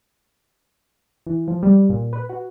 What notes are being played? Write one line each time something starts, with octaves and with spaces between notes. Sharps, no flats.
E3
F3
G3
A#2
B4
F#4